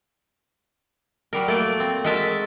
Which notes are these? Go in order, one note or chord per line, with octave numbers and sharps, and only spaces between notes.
F#3 G3 A#4
A3 A#3 D5
C4
G#3 F#4 A#4 E5 A5